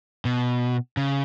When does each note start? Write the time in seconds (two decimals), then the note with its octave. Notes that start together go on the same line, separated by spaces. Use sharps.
0.25 B2
0.97 C#3